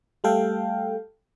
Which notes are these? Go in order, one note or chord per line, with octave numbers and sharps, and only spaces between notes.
G3 A3 A4 F5 G5